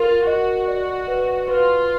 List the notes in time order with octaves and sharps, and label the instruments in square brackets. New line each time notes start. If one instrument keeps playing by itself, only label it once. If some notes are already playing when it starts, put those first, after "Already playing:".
Already playing: [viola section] F4 [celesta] A#4
[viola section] F#4 [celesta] D#5
[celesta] D5
B4
[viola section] F4 [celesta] B4